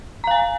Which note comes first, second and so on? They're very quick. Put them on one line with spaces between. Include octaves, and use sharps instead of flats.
A#5 F5 G#5